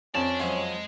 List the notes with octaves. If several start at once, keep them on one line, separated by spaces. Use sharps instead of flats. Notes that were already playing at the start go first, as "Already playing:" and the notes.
F2 C#4 D5 A5
F#2 F3 G#3 E5